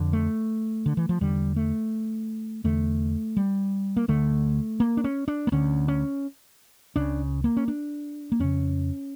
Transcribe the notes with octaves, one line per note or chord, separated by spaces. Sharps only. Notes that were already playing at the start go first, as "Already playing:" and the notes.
Already playing: F2 D3
A3
D3
E3
F3
E2 D3 G3
A3
E2 D3 A3
G3
A#3
D2 D3 A3
A#3
D4
C#4
D4
A#3
D2 D3 C#4
C#4
C#2 C#3 D4
A#3
C#4
D4
A#3
F2 C#3 C#4